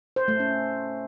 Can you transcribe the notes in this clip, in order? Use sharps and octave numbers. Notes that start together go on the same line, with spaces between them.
C5
A3
C#4